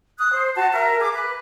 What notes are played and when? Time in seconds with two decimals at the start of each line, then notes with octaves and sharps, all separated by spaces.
0.18 D#6 F#6
0.32 C5
0.55 F#4 A5
0.71 A#4 E5
1.00 G#4 D6
1.12 B4